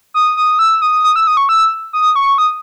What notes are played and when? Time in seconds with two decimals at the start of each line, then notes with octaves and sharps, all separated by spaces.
0.14 D#6
0.37 D#6
0.59 E6
0.82 D#6
1.04 D#6
1.16 E6
1.27 D#6
1.37 C#6
1.49 E6
1.93 D#6
2.16 C#6
2.38 D#6